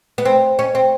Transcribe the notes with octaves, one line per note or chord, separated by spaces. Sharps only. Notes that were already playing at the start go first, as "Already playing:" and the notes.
B3
C4
C#4
C4